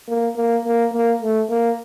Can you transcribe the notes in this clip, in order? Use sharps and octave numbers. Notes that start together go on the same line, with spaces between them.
A#3
A#3
A#3
A#3
A3
A#3